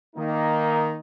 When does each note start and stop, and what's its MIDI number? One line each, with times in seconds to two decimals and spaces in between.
0.16 0.98 51
0.16 0.98 58
0.16 0.98 63